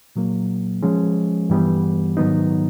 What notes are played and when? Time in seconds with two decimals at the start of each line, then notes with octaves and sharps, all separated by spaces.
0.16 A#2 F#3 A#3
0.82 F3 G#3 C#4
1.50 G2 E3 G3 B3
2.17 G#2 D#3 F#3 B3 D#4